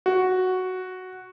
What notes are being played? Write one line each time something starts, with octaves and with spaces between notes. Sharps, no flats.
F#4